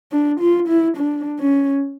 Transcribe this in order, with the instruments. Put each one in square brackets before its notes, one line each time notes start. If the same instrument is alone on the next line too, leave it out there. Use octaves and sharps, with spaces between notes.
[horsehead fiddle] D4
F4
E4
D4
C#4